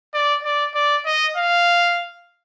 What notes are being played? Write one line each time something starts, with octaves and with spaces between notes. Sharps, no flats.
D5
D5
D5
D#5
F5